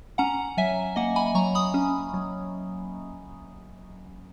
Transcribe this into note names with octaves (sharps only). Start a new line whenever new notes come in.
C#4 F#5 A#5
F#3 E5 G#5
A#3 D#5 F#5
G#5 B5
F#3 A#5 C#6
B5 D#6
C#4
F#3